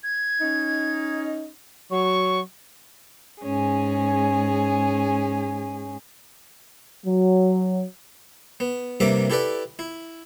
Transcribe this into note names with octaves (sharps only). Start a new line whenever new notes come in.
G#6
C#4 D#4
F#3 C#6
G#2 C#4 G#4
F#3
B3
G2 C3 G3 A#3 E5 D6
E4 G4 A4 B4 D5
E4